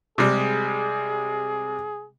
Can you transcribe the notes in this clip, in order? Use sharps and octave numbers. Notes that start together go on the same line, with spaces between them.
C3 G3 G#3 G#4